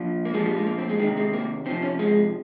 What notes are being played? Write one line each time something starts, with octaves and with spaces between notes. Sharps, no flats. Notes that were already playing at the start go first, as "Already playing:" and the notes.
Already playing: A#2 F3
A#3
A#2 F3 G#3
G3
G#3
A#3
C4
G#3
D#3 G#3
C3
G#3
A#3
C3 F3 C4
C#4
G#3